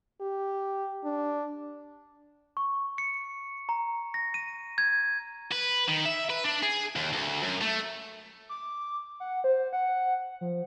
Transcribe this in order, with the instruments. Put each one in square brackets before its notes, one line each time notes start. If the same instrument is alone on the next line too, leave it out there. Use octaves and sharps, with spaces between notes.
[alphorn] G4
D4
[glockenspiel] C#6
C#7
A#5
A#6
D#7
G#6
[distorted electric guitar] B4
D#3
E5
B4
D4
G#4
D#2
D2
F#2
A3
[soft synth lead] D6
F#5
C5
F#5
F3